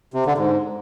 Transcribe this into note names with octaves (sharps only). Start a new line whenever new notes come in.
C3
D3
G#2